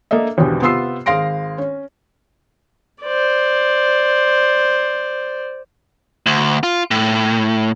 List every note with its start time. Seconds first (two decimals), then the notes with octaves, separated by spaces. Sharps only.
0.11 A#3 D4 A4 D#5 E5
0.37 G#1 E2 B2 D3 G4
0.61 C3 B3 F4 C6 E6 C7
1.06 G#1 G#4 F5 C6 A#6 D7
1.58 C#4
3.03 C5 D5
6.26 D2
6.63 F4
6.91 A2